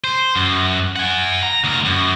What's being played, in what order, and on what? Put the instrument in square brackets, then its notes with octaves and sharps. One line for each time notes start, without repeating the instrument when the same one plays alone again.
[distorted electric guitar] C5
F#2
F#5 G#5
A#5
D2 A#4
F#2